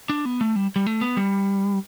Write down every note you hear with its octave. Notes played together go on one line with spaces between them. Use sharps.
D4
B3
A3
G3
G3
A3
B3
G3